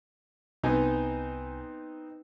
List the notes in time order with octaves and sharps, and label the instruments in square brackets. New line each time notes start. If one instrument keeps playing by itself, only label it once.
[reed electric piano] C2 G#5 [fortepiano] B3 C4 D#4